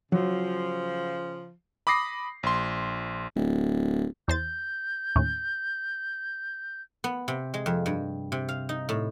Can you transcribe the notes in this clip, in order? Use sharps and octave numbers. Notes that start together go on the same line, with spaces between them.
C#3 F3 F#3
B5 D6 D#6 A#6 C7
A#1 C6
D1
E2 C5 G6 A6
D#2 A2 C#4
B3
C3
G#3
F2
G2
C3
F5
D#4
A2